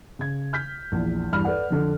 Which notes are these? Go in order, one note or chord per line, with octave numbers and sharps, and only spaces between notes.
C#3 G#6
F6 G6 B6
A#1 E2
E2 G2 B5 F6
A4 B4 D5 F#5
F2 D3